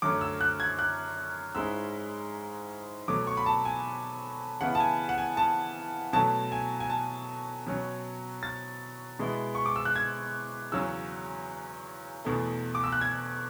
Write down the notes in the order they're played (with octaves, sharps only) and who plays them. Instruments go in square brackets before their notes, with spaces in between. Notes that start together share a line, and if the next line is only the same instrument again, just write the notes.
[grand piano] F#2 D3 F#3 A3 C#4 D6
E6
F#6
G#6
F#6
G#2 G#3 C#4 E4 E6
B2 F#3 A3 D6
C#6
B5
A5
G#5
C#3 E3 B3 E4 F#5
A5
G#5
F#5
G#5
A5
B2 F#3 A3 A5
G#5
G#5
A5
B2 F#3 C#4
A6
B2 G#3 B3 E4
C#6
D6
E6
F#6
G#6
E2 C#3 F#3 C#4 E6
E2 B2 A3
D6
E6
F#6
G#6